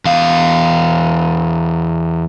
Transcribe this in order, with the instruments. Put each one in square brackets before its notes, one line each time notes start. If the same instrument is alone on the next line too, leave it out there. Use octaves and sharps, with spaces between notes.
[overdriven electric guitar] E2 F5